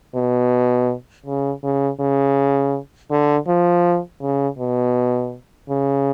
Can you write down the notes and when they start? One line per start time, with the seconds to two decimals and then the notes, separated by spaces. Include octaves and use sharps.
0.15 B2
1.26 C#3
1.64 C#3
2.00 C#3
3.11 D3
3.48 F3
4.22 C#3
4.59 B2
5.69 C#3